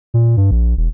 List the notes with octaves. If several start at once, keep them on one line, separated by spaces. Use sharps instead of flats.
A#2
G2
A#1
E1